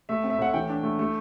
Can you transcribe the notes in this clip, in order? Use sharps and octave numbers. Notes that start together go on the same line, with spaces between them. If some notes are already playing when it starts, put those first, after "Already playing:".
A3 E5
C4
E5
A2 F#5
E3 G5
D4
A3
A3